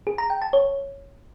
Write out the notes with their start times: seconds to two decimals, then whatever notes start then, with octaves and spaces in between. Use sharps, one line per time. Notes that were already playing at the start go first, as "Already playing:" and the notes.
0.07 G#4
0.18 A#5
0.30 G5
0.42 A5
0.53 C#5